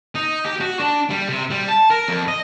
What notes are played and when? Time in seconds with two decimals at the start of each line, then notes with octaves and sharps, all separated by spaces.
0.15 D#4
0.45 G4
0.60 F#4
0.79 D4
1.10 G3
1.29 C3
1.50 G3
1.68 A5
1.91 A#4
2.08 F2
2.28 D#5